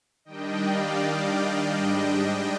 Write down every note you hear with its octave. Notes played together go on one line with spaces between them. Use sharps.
D#3 G3 D4 D#5 G5
D5 F5
D#5 G5
G#2 G3 D4 D#5 G5